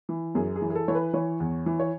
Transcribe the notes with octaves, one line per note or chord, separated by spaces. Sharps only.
E3
F#2 G#4
G#4
E3
G#4
A4
E3 C#5
B4
E3 C#5
E2
E3
C#5